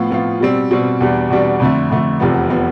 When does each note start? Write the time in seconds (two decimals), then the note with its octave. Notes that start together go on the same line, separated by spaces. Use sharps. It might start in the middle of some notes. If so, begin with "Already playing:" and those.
Already playing: A2 F3 B3 F4
0.10 A2 F3 B3 F4
0.40 B2 G3 C4
0.71 B2 G3 C4
1.01 E2 B2 G3 D4
1.30 E2 B2 G3 D4
1.60 F2 D3 A3
1.90 F2 D3 A3
2.20 F1 E2 C3 F3 B3
2.50 C3 F3 B3